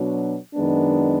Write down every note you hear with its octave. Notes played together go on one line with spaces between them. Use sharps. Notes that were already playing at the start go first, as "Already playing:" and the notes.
Already playing: B2 F#3 D4
F#2 D#3 G#3 B3 D4